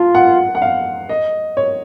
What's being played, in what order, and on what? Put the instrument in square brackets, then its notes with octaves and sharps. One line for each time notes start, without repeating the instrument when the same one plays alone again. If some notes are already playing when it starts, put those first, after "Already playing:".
Already playing: [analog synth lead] F4 [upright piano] A5
[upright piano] F#5
F#5
F5
D#5
C#5